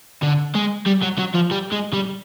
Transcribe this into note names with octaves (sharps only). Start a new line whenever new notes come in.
D3
G#3
G3
F#3
F#3
F3
G3
G#3
G3